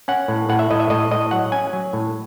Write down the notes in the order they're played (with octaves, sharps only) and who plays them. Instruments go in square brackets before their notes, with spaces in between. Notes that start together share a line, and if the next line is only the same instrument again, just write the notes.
[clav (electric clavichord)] C#4 F#5
A2
A2 F#5
E5
A2 D#5
E5
A2 D#5
A2 D#5
F#3 F#5
C#4 G#5
F#3
A2